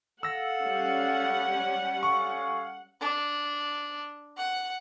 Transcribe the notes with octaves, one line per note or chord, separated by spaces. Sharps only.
A4 F5 F#5 E6 A#6
G3 C#4
A4 F5 G#5 C#6
D4
F#5